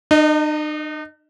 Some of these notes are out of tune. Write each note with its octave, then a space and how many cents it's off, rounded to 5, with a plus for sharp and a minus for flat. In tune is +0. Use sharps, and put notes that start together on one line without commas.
D#4 -45 D#5 +0